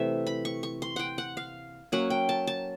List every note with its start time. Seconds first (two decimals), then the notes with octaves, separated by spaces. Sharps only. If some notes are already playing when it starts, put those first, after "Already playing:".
Already playing: C3 E3 A3 E5
0.27 B5
0.45 C#6
0.63 C#6
0.82 C6
0.96 F#5 G5
1.18 F#5
1.37 F5
1.92 F#3 A#3 C#4 F#5
2.10 G5
2.29 A5
2.47 A5